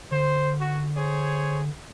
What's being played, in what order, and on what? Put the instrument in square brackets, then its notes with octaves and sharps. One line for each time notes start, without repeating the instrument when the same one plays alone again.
[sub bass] D3 [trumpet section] C5
[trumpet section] F#4
G#4 C5 C#5